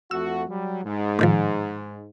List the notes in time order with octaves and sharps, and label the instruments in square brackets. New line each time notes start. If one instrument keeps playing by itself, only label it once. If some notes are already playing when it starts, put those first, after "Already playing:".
[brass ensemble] F2 A3 F#4 [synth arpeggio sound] E6
[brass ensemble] F#3 G3
G#2
[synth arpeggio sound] A2 D#3 F3